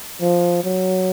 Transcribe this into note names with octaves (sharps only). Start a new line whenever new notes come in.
F3
F#3